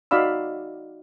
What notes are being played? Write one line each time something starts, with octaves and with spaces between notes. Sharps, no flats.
D#4 F#4 D5 F5 B5 E6